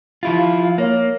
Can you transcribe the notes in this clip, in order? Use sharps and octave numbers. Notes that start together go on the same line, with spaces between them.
F3 E4 F4 G4
F5
A#3 C#5